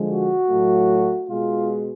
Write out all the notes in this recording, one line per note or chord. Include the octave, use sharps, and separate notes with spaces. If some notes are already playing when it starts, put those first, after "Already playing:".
Already playing: D3 F3 G#3
F#4
A2 F#3 A3
B2 G#3 F4